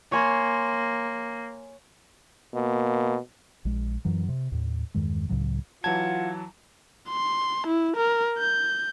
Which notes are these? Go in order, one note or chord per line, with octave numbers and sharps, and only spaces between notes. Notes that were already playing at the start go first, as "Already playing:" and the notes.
A#3 C#5 G#5 C6
B2 A#3
A#1 G#3
F#2 E3 F#3
C3
D#2 A2
E2 G2 D#3 G#3
C#2 A2 C#3 F#3
E3 F#3 F4 F#5 A5 G#6
C6
E4
A#4
G6